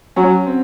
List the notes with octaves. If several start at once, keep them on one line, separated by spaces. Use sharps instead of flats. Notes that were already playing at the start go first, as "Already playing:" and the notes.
F#3 C#4
C4